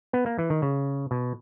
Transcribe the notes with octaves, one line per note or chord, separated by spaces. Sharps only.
B3
A#3
E3
D#3
C#3
B2